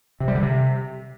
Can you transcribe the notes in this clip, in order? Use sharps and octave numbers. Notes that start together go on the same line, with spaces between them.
C3
G3
D3
C3